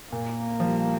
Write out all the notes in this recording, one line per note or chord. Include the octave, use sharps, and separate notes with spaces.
A#2 A#3
F3
G3